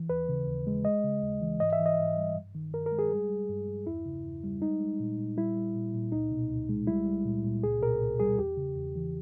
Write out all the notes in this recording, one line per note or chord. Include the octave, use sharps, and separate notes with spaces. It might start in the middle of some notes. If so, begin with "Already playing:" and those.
Already playing: E3
D#2 B4
C#3
D#2
G#3
G#3 D#5
C#3
D#2
E3
G#2 D#5
E5
E3
D#5
G#2
G3
G2
D#3
G2 A#4
A#4
G#3
G#4
G3
G3
G2
G2
E2 E4
C#3
E2
G3
G#3 D#4
G#3
A#2
A#2
G3 E4
G3
A#2
A#2
C#2 D#4
B2
C#2
G#3
G3 E4
G3
A#2
A#2
C#2 G#4
B2 A#4
C#2
G3 G#4
E2 G4
C#3
E2
E3